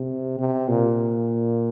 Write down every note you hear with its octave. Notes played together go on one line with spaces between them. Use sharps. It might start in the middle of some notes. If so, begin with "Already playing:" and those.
Already playing: C3
C3
A#2